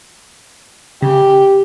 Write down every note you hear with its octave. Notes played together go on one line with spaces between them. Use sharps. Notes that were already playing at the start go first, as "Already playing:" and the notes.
C#3 G4